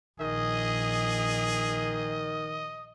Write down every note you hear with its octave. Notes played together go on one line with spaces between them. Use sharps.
A#1 D#3 G#4 D#5